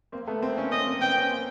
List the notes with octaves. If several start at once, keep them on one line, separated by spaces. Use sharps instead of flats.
A#3 C4
A3 B3
A#3 C4
B3 C#4
A#3 C4 D#5
A#3 C4
B3 C#4 G5
B3 C#4
A#3 C4